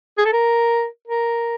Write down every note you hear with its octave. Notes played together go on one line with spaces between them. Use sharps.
G#4
A4
A#4
A#4